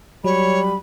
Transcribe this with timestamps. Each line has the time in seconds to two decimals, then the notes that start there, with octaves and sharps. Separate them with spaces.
0.24 F#3 G3 C#5 B5